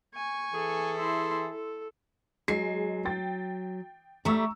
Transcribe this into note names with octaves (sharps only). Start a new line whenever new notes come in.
G#5 C#6
E3 G#4 A4
E4 C6
A4
F#3 G#3 C7
G5 A6
G3 A3 A#5 C#6 E6